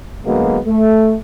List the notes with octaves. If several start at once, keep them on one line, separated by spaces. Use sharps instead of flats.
D2 F#3 G#3 A#3 B3
A3